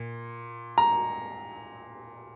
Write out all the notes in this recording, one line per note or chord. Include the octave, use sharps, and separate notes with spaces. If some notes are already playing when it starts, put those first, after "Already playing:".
Already playing: A#2
A#5